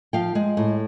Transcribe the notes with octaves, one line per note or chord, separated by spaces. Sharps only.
F3 F5 G5
G#3
A2